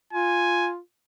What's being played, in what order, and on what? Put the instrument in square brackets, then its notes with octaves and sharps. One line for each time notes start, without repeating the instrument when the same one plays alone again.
[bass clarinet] F4 [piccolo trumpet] G#5